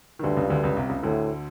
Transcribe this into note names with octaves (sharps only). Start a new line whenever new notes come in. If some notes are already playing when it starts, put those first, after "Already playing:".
D#3
D2 G2 D3
C#2 C#3
D2 D3
C#2 C#3
C2 C3
C#2 C#3
D2 A2 D3